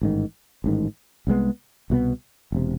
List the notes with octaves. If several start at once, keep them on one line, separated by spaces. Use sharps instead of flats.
A1 G#2 D#3
A1 G#2 D#3
C2 B2 G#3 B3
C2 B2 G#3 B3
E1 C3